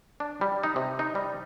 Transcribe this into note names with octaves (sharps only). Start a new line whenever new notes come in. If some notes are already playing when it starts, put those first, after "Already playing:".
D4
G3
D#4
C3
D#4
G3